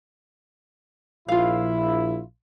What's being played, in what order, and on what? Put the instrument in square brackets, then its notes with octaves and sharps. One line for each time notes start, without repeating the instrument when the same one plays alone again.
[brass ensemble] A#1 E4 [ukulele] F4 F5